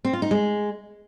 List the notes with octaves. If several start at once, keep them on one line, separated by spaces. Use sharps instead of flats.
C4
F4
D#4
G#3